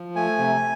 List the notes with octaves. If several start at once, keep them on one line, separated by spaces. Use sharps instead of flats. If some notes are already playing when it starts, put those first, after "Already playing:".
Already playing: F3
A3 G#5
C3